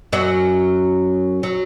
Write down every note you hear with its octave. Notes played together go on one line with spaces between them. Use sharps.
F#2 F#3
F#3